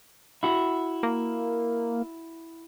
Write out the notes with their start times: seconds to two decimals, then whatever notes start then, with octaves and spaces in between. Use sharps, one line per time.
0.43 E4 F#4
1.03 A#3